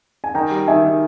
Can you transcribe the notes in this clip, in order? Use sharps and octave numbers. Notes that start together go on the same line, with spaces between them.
G#5
D#3 G5 A#5
G3
D#3 E5 G#5
D#3